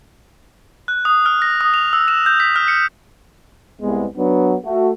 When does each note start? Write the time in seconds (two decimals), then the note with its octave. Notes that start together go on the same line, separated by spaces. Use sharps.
0.88 F#6
1.05 D#6
1.26 F6
1.42 A#6
1.61 D#6
1.74 F7
1.93 E6
2.08 E7
2.26 G6
2.40 B6
2.56 F6
2.68 C#7
3.81 C2 G#3 B3
4.17 F#3 B3 D4
4.64 A3 F#4